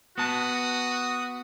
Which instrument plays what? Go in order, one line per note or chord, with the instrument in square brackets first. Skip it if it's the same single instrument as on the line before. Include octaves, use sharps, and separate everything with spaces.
[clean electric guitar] B3 A5 [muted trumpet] F#4 [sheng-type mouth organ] D#6